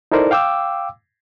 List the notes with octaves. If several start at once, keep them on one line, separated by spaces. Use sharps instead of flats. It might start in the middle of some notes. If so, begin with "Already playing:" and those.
D#4 E4 A4 A#4 C5 D5
F5 G5 D6 E6